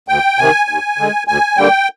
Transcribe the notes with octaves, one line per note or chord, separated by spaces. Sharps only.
D2 G5
C3 D#3 G#5
D#2
D3 G#3
D2 G#5
D3 G3 A#3 G5